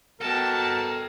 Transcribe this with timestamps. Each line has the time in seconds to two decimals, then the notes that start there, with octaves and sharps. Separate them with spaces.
0.21 B2 A4 A#4 G5 A5